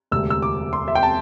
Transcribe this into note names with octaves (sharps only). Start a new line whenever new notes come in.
E1 D2 C3 E6
E6
D6
C6
E5
G5
A5